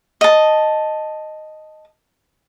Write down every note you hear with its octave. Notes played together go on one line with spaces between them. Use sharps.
D#5 A5